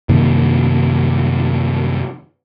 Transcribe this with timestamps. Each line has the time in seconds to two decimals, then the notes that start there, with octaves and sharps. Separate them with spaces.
0.09 F#2 C3 D#3 A#3